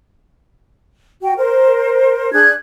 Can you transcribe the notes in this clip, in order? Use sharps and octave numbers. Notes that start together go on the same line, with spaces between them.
F#4 G5
A#4 C5
D4 G#4 F#6 G#6